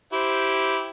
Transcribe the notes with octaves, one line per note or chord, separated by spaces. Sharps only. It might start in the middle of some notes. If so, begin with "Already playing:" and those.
E4 G4 C5